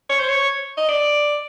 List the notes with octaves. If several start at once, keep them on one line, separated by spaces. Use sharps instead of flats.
C#5
C5
C#5
D#5
D5